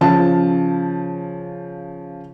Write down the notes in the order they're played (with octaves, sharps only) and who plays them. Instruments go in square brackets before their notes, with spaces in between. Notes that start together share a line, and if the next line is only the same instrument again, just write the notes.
[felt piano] C#3 F3 A5